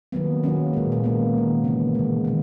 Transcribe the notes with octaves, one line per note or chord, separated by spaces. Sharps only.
D#3 F#3 A#3 B3
D#3 F#3 A#3 C#4
A#2 G#3
A#3
D#3 A#3 B3
D#3 G#3
C#3 E3 A#3 B3
B2 G#3
D#3 A#3